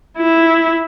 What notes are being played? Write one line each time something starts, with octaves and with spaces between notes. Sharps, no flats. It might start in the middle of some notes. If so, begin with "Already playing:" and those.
E4